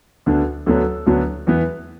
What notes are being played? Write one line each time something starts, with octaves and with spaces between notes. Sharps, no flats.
D2 D3 B3 D4
D2 D3 F#3 B3 D4 A4
D2 D3 F#3 B3 D4
E2 E3 B3